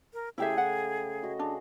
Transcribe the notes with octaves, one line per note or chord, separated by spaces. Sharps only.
A#4
C#3 A3 E4 G4 G#4 E5 G5
F#5
F#4 D#5
D4 G#4